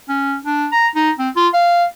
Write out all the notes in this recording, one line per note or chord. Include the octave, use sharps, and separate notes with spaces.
C#4
D4
A#5
D#4
C4
F4
F5